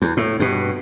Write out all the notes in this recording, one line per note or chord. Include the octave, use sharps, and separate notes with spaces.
E2
A2
G2 B2